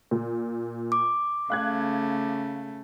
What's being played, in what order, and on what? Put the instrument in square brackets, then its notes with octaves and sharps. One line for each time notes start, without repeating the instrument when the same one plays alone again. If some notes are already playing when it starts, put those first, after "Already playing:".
[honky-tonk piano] A#2
[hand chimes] D6
[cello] C#3 A3 [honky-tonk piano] F5 F#6 G#6